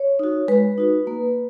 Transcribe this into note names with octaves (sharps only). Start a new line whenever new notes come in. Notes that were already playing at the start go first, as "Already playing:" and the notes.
Already playing: C#5
D#4 F#4
G#3 B4
D#4 F#4
A#3